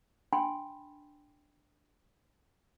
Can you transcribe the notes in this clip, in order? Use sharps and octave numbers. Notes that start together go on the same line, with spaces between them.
D4 G5 G#5 B5 C6